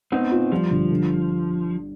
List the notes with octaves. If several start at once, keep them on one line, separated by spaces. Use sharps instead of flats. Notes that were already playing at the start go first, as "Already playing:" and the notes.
B3 C4 D#4
F4
F3 G3
G1
D3